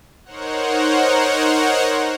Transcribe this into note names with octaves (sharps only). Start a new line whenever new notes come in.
D#4 A#4 C5 C#5 F#5